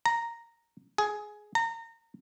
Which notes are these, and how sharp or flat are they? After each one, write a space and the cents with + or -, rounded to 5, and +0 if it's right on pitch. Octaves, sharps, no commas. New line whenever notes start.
A#5 -5
G#4 +10
A#5 -30